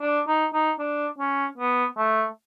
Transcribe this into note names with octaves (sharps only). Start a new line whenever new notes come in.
D4
D#4
D#4
D4
C#4
B3
A3